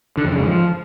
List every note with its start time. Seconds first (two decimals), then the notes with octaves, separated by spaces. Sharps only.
0.18 D3
0.25 F2
0.32 C#3
0.39 G#2
0.46 F3